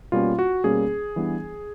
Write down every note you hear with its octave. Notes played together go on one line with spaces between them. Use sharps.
B2 G3 A#3 C#4 F4
F#4
B2 G3 A#3 C#4 G#4
E3 G3 B3 D4